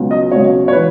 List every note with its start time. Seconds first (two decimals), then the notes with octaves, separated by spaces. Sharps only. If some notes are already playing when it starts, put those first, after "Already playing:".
Already playing: C#2 B2 F#3
0.11 D#5
0.31 C#2 B2 F#3 C#5
0.68 C#5
0.72 E3 B4